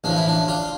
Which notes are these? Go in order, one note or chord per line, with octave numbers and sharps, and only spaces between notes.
A1 A2 F3 D4
E4
D4
D4 F4